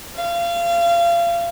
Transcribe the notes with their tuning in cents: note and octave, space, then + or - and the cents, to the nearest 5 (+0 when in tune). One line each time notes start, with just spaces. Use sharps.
F5 -30